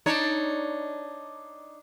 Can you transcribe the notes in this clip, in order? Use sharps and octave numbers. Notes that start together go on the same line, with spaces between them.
D4 D#4 C#5